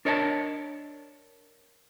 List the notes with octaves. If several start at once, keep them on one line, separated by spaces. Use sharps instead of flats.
D4 A#4 C#5 D#5 F#5 A5